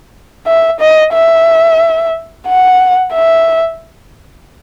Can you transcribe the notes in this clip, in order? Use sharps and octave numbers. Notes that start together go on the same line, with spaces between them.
E5
D#5
E5
F#5
E5